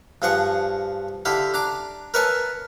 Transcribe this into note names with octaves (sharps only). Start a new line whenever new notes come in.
G2 F3 G#4 F#5 C#6
D3 E4 G4 F5 B5
D4 A#5 D6
A#4 B4 C#5 E5 G#5 A5